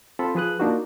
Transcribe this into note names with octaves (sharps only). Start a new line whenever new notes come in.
C4 F4 A4 B5
F3 G#4 B4 D#6 F#6
A#3 D4 D#4 F4 F#4